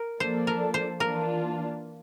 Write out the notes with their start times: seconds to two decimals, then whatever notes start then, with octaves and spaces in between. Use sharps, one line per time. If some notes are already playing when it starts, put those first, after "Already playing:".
Already playing: A#4
0.20 F3 A#3 D4 A4 C5
0.47 A#4
0.74 C5
0.99 E3 A#3 D4 F4 A#4